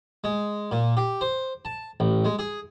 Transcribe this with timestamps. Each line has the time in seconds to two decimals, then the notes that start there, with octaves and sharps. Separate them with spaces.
0.24 G#3
0.71 A#2
0.97 G4
1.21 C5
1.65 A5
2.00 A1
2.25 G#3
2.39 G#4